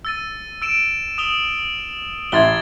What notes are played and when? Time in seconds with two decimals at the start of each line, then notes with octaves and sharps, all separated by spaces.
0.05 E6 A6 D#7
0.62 E6 D7 E7
1.18 D#6 F7 G7
2.32 A1 E4 C6 G#6 A6 G7